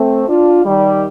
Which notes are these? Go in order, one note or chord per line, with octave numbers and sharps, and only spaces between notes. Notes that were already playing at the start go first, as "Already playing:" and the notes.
Already playing: A3 C4
D4 F4
D#3 G3